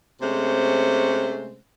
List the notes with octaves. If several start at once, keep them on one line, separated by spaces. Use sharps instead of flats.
C3 G#3 A3 C#4 C5